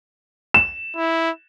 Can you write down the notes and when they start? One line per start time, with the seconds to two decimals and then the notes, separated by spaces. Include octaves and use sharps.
0.54 E7
0.96 E4